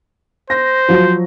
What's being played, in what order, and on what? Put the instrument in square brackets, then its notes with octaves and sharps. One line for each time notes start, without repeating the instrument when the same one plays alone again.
[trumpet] C5 [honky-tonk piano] A#6
[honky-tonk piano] F3 F#3